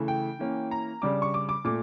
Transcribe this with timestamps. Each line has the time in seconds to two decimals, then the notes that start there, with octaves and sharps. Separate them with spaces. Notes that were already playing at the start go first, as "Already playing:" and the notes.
Already playing: C#3 E3 A3
0.08 G5
0.39 E3 A#3 C#4
0.71 A#5
1.02 C#3 G3 D4 D6
1.22 C#6
1.34 D6
1.49 D6
1.64 A#2 A3 D6